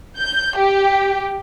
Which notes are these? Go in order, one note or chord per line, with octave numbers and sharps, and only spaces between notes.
G6
G4